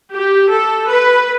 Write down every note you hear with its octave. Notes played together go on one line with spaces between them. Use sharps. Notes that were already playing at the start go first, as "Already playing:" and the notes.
G4
A4
B4